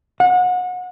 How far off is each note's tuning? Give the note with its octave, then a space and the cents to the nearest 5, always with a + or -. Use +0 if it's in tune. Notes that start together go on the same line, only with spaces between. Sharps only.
F#5 -30